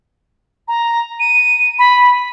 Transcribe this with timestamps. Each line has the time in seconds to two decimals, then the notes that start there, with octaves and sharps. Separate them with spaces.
0.68 A#5
1.20 D#7
1.79 B5